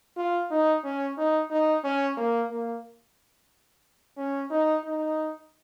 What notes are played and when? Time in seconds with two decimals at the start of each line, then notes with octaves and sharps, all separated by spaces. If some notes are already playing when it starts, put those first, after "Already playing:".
0.17 F4
0.51 D#4
0.84 C#4
1.18 D#4
1.51 D#4
1.84 C#4
2.17 A#3
2.51 A#3
4.17 C#4
4.51 D#4
4.84 D#4